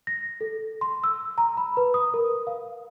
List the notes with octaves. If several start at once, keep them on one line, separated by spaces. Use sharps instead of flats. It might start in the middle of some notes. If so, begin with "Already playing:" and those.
A#6
A4
C6
E6
A#5
B5
B4
D#6
A#4
F5